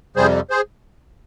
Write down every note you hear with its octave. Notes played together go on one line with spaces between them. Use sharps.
F2 C3 G3 G#4 C5
G#4 C5